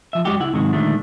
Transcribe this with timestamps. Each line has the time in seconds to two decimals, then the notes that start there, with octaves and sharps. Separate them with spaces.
0.13 F3 E5
0.25 F#2 G3 G#3 F#4 G4
0.40 C#2 E4 F#5
0.53 G#2 C3 D#3 F#3 G#3 F#4
0.73 A#2 D3 D#3 G#3 A3